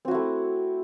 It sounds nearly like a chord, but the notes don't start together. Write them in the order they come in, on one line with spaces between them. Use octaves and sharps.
C4 F#4 E4 A3